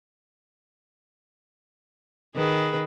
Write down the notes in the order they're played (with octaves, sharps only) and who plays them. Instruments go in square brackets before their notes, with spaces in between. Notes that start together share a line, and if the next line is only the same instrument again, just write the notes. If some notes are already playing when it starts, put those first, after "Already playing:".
[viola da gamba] D#3 [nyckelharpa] G#4 B4